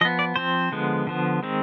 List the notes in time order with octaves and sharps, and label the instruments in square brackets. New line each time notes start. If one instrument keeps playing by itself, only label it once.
[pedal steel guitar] F3 D#5
B3
D5
F3 C4 C5
D3 F3 G#3 B3
D3 F3 B3
D#3 G#3 C4